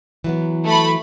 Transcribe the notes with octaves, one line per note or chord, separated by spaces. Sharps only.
E3 F#3 B3
A3 B5